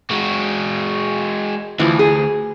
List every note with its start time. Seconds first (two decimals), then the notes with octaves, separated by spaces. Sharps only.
0.10 G#3 F#4
1.79 D2 E3 F3
1.99 G#4